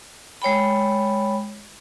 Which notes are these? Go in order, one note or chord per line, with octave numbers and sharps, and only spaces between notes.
G#3 C#5 G5 B5